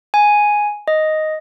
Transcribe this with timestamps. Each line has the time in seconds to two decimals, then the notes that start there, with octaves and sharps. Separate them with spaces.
0.14 G#5
0.88 D#5